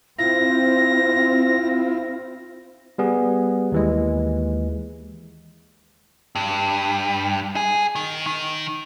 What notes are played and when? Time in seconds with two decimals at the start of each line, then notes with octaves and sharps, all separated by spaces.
0.19 C4 E4 F4 A#6
2.98 G3 B3 G#4
3.72 D#2 E3 G#3
6.35 G2
7.56 G#4
7.96 D#3
8.26 D#3